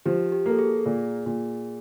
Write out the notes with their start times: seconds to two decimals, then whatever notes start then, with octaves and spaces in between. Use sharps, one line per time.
0.06 F3 G4
0.32 G4
0.46 A#3 A4
0.59 G#4
0.86 A#2
1.26 A#2